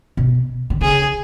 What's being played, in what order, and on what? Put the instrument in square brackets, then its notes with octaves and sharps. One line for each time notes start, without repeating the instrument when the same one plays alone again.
[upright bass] B2
D3
[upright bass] C#3 [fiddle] G#4